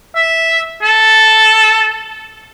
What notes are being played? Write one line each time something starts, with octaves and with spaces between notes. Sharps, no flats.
E5
A4